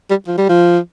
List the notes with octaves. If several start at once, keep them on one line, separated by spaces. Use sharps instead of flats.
G3
F3
G3
F3